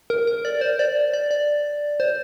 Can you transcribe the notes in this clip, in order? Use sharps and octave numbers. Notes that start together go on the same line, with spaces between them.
A#4
A#4
D5
C5
D5
D5
D5
C5